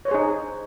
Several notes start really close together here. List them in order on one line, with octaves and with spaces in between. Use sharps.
C#5 C5 G#4 D#4